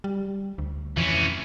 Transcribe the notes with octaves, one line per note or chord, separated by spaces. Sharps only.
G3
D2
F2 E3 C#4